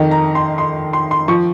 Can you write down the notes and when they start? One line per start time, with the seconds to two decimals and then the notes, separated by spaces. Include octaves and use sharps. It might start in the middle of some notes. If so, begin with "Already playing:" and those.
Already playing: F2 D#3
0.11 A#5
0.35 C6
0.58 C6
0.93 C6
1.11 C6
1.28 F3 C#6